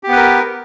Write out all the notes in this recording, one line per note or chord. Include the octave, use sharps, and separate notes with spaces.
B3 G4 A#4 B4